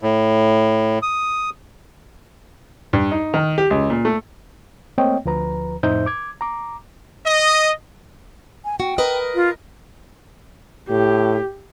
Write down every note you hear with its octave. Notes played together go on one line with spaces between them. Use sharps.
A2
D#6
G2
D#4
D#3
G4
C#2
A#2
A3
A3 A#3 C4 C#5 D#5 G5
D2 F3 B4 A#5
F2 A2 D#4 C5 E5 G6
D6 G#6
A#5 D6
D#5
G#5
F#4 G5
A#4 B4 D#5
F4
A2 G4